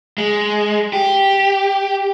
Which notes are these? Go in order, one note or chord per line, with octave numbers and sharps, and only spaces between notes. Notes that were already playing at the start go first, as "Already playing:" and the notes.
G#3
G4